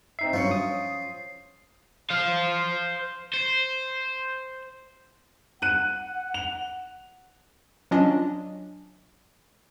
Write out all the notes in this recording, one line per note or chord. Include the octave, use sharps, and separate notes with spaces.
C4 D#4 E5 C7
G2 F3 F#3 C#4 C#7
D#6
C5 F5
C5
F#5 F#6 D#7
F7
F#3 C#4 D4 F4 D#5